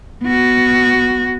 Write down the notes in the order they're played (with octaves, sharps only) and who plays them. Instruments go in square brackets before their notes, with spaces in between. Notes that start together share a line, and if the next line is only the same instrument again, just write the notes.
[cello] B3 F#4